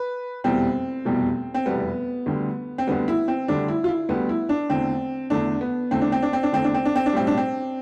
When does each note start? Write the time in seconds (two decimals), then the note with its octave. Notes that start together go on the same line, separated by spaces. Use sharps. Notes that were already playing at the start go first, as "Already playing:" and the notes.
Already playing: B4
0.44 F1 E2 B2 G3 C4
1.05 F1 E2 B2 G3
1.54 C4
1.66 F1 E2 B2 G3 B3
2.26 D2 D3 G3
2.78 C4
2.87 D2 D3 G3 B3
3.08 E4
3.28 C4
3.48 D2 D3 G3 D4
3.68 E4
3.84 F4
3.89 E4
4.09 D2 D3 G3 B3
4.29 E4
4.49 D4
4.69 E2 D3 A3 C4
5.30 E2 D3 A3 D4
5.61 B3
5.91 E2 D3 A3 C4
6.01 D4
6.12 C4
6.22 D4
6.33 C4
6.43 D4
6.52 E2 D3 A3 C4
6.64 D4
6.74 C4
6.85 D4
6.96 C4
7.06 D4
7.13 B1 A2 G3 C4
7.27 D4
7.37 C4